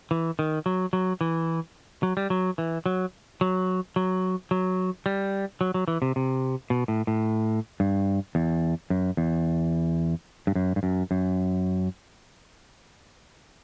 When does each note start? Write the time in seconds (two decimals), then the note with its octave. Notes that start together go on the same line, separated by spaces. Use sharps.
0.11 E3
0.39 D#3
0.66 F#3
0.93 F#3
1.21 E3
2.03 F#3
2.17 G3
2.30 F#3
2.58 E3
2.86 F#3
3.41 F#3
3.96 F#3
4.51 F#3
5.06 G3
5.61 F#3
5.74 F#3
5.88 E3
6.02 C3
6.16 C3
6.70 B2
6.88 A2
7.07 A2
7.80 G2
8.35 E2
8.90 F#2
9.17 E2
10.47 G2
10.55 F#2
10.76 G2
10.83 F#2
11.11 F#2